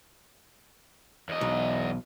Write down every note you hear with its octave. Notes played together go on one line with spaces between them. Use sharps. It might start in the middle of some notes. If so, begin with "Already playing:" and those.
E2 D#5
B1